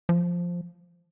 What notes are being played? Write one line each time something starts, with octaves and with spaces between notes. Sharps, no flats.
F3